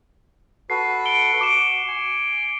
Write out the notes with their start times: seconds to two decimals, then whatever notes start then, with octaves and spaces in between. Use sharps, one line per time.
0.70 F#4 A4 B4 C7
1.06 C#7 D7 G7
1.41 F#4 D6 D7 E7
1.88 G#5